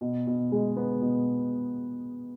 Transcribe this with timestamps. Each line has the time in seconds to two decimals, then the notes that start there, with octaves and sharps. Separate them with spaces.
0.01 B2
0.27 B2
0.52 G#3
0.76 B3
1.01 B2